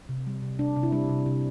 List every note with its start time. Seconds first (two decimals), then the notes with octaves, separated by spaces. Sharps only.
0.09 C3
0.27 G3
0.42 C3
0.59 C3 D4
0.76 C3
0.83 E4
0.92 G3 D4
1.09 C3
1.26 C3